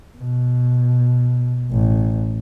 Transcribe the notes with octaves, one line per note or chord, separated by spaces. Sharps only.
B2
A1